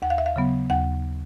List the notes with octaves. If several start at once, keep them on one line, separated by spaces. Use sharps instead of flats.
D#2 F#5
F5
E5
F5
C#3 F#3 B3
D#2 F#5